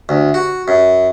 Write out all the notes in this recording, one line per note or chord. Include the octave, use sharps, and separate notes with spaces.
D2
F#4
F#2